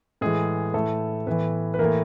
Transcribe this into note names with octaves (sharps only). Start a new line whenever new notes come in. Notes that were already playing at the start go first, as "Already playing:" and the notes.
A2 E3 G#3 G#4
A2 E3 A3 A4
A2 E3 B3 B4
B4
A2 E3 A#3 A#4